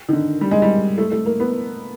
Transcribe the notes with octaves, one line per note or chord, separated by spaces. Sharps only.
D#3
D3
G3
G#3
G3
A3
A3
A#3
B3